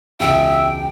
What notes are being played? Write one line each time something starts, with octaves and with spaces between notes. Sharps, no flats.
E1 C#2 E5 G5